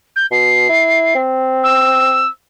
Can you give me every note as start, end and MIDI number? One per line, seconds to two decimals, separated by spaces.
0.16 0.26 91
0.31 0.68 47
0.31 1.20 96
0.69 1.11 64
1.15 2.26 60
1.63 2.28 88